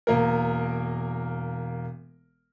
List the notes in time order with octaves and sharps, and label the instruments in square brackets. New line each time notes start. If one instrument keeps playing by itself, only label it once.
[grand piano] E1 A#3 A#4